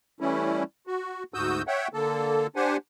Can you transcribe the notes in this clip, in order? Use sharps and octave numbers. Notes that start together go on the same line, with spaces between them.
E3 G3 A3 C#4 E4
F#4
D2 G#2 F#4 D#6 E6 G6
C#5 E5 F#5 G5
D3 A#3 A4
D4 G4 C5 F#5 G#5